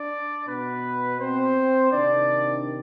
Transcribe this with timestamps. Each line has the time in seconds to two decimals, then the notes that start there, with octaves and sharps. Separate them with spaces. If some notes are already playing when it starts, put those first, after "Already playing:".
Already playing: D4 D5
0.47 B2 B3 B4
1.20 C4 C5
1.91 C3 D#3 D4 D5